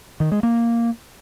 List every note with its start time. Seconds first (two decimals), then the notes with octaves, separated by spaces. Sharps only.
0.20 D#3
0.32 G#3
0.43 A#3